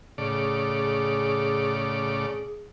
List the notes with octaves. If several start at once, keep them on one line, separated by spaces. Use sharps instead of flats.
A2 C#3 G#4 D5